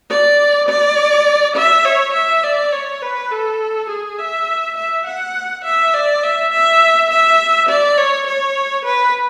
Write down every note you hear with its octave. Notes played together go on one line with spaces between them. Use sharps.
D5
D5
E5
C#5
E5
D5
C#5
B4
A4
G#4
E5
E5
F#5
E5
D5
E5
E5
E5
D5
C#5
C#5
B4